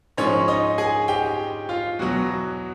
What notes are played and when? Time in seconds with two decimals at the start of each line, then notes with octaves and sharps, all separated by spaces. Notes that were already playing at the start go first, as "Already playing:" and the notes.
0.17 G#2 F3 G#3 C#4 C#5
0.48 D#4 D#5
0.78 G#4 G#5
1.08 G4 G5
1.69 F4 F5
1.99 E2 B2 F#3 F#4 F#5